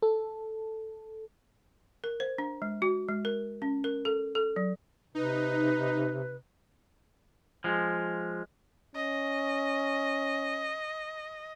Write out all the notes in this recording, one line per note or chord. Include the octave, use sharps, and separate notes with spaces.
A4
A#4
C5
D4
G#3
F#4
G#3
A#4
C#4
A#4
A4
A4
F#3
C3 D#4 B4
F3 G#3
C#4 D#5